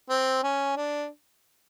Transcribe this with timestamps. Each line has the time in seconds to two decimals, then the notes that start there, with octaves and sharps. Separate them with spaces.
0.10 C4
0.43 C#4
0.77 D4